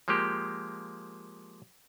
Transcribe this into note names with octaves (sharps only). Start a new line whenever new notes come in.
F3 G#3 A#3 G4